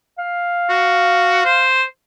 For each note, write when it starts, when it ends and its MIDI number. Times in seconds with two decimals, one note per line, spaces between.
0.19 1.67 77
0.69 1.44 66
1.45 1.83 72